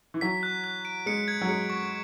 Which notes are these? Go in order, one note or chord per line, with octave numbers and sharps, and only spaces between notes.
E3
F#3 B6
F#6
F#6
D7
G#3 C#7
G#6
F#3
G#3 C#7
C#6